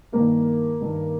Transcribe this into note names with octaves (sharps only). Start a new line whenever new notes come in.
G2 D#3 A#3
G2 D#3